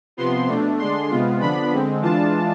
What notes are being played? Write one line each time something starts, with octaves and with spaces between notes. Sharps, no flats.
C3 F3 B3 C6
B2 A3 D4
D3 G#3 D4 C6
C3 G#3 B3 F4
D3 F3 B3 D4 B5
D3 G#3 C4
E3 G#3 D4 F4 A5